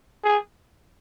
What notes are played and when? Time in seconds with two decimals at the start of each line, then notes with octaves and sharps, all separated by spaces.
0.24 G#4